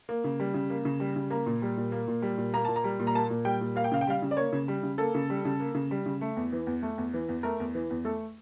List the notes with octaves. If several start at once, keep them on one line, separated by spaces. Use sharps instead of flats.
A#3
C#3
G3
C#3
A#3
C#3
G3
C#3
A#3 A#5
A#2
G3
A#2
A#3
A#2
G3
A#2
A#3 A#5
A#2 A5
A#5
G3
A#2
A#5
A#3 A5
A#2
G3 G5
A#2
A#3 F5
G5
C#3 F5
G5
G3 F5
C#3
D5
A#3 C#5
C#3
G3
C#3
A#3 A4
C#3
G3
C#3
A#3
C#3
G3
C#3
A3
E2
E3
E2
A3
E2
E3
E2
A3 A#4
E2
E3
E2
A3 A4